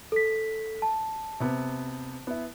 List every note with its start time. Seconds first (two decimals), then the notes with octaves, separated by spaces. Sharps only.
0.12 A4 B6
0.82 A5
1.40 C3 B3
2.27 B3 E4